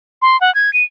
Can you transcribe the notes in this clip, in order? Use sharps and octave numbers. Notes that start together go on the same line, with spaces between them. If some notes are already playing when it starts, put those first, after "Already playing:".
C6
F#5
G#6
D#7